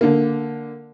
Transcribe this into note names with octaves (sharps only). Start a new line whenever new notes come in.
D3 A#3